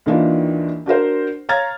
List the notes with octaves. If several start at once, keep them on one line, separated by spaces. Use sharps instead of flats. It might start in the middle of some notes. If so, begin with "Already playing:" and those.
D#2 D#3 E3 D4 F4
D4 F#4 A#4 C5
C#5 F5 A#5 F6 G#6 A6